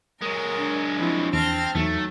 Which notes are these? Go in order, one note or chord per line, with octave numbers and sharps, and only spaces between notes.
F#3 G#3 A#4
D4
F3 C4 E4
E2 C4 A5 F6 A#6
E2 F#3 A3 D#4